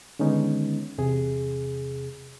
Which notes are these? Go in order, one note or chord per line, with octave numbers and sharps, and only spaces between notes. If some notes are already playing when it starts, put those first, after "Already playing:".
D3 D#3 G#3 B3 C#4 D#4
E2 C3 G#4